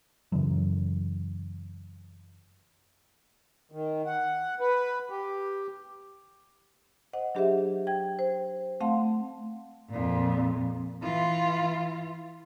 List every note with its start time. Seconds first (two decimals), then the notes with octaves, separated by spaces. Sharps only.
0.32 F#2 C#3 E3 F#3
3.72 D#3
4.06 F#5
4.60 B4
5.10 G4
7.13 C5 D#5 F#5
7.35 F#3 D4 G4 G#4 C5 E5
7.87 G5 G#6
8.19 C5
8.81 A3 C4 F5 F#5 A5 C6
9.90 F2 A#2
11.02 E3 F4